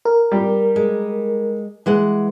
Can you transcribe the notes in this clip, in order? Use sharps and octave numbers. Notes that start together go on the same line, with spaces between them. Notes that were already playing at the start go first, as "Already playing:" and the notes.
A#4
G3 G4
G#3
E3 G#3 F#5